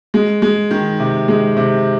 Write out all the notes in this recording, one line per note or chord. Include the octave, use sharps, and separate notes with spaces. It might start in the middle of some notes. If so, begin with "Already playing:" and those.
G#3
G#3
D#3
C3
G#3
C3